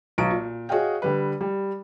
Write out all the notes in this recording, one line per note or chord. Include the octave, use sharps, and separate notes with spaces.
B1 A#5 C#6 D7
A#2
F#4 G#4 C#5 D#5 F5 G5
D3 G3 B4
G3